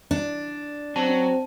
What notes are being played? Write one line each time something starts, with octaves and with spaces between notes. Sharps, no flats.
D4
F#3 C4 A5